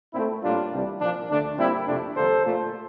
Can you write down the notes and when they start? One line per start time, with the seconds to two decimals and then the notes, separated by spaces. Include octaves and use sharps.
0.14 A#2 C4 E4
0.18 A3
0.43 A2 G3 A#3 D4 F4
0.72 C2 C3 E3 G3
1.00 A#2 F3 A#3 D4
1.29 D2 D3 A3 D4
1.58 A#2 G3 A#3 C4 E4
1.87 F2 C3 F3 A3 D4
2.16 F2 D3 G3 A#3 A4 C5
2.46 A#2 F3 A3